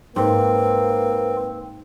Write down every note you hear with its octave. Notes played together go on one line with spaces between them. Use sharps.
G#2 A#3 C4 B4